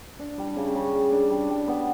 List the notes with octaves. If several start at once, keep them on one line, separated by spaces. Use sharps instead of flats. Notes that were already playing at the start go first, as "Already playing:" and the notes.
D4
G3
C#3
C#3
G3
D4
G3
G3
B3